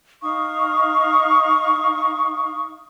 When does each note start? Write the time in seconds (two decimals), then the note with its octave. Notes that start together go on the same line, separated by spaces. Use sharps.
0.22 D#4 F5 C#6 D#6